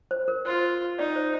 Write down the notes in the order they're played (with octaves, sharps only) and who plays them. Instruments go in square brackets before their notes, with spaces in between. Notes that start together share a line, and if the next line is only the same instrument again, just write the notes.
[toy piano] C5
A#4
[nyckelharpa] F4 [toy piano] C5
[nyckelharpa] D#4 [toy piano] D5
[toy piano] C5